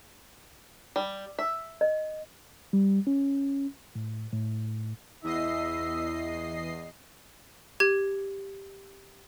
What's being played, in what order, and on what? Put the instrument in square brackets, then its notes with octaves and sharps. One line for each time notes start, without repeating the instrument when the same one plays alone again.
[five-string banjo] G3
E5
[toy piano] D#5
[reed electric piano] G3
C#4
A2
A2
[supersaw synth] E2 D#5 C7 [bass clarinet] E4 [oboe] E5
[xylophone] G4 G#6